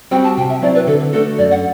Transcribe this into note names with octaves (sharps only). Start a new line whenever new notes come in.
G3 C4 F#4 G5
A5
C3 G5
E5
F#3 C4 E4 D5
B4
D3 A4
A3 D4 F#4 A4
F#2 D5
F#5